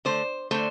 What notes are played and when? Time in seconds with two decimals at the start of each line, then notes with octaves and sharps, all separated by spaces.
0.05 D3 A3 C5
0.51 D3 A3 C5